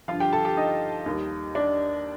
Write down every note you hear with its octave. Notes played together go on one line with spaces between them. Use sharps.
G2 D3 F3 F4 F5
G4 G5
A4 A5
G4 G5
D#4 D#5
D#2 D#3 G3
D4 D5